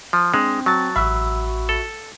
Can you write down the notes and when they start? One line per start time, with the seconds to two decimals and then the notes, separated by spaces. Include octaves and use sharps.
0.13 F3
0.34 G#3 C4 D4
0.66 F#3 A5 A6
0.96 A1 F#4 E5 B5
1.69 A4